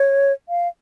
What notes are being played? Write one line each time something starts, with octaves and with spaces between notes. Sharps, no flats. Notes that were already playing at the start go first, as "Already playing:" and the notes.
Already playing: C#5
F5